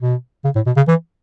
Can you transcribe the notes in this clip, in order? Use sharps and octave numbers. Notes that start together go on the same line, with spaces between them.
B2
C#3
A2
B2
C#3
E3